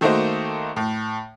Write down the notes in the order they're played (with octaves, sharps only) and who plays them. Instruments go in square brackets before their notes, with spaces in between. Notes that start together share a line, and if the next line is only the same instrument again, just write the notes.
[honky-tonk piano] D#3 A3 A#3 D#4 F#4 C5
A2